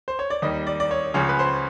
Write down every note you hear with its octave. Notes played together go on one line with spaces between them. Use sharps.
C5
C#5
D5
D#2 D#3 G3 D#5
D5
D5
C#5
C#2 C#3 F3 C#5
B4
C5